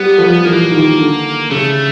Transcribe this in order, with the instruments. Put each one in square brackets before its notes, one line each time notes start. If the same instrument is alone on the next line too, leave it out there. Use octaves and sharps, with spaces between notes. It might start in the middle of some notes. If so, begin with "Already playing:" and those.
Already playing: [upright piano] G3 [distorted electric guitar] B3
[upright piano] F3
[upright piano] E3 [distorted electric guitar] A#3
[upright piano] D#3
D3
[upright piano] C#3 [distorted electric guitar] A3